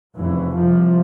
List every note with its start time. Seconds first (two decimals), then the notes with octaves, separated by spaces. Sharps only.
0.16 F1 F2 C#3 E3
0.55 C2 C3 F3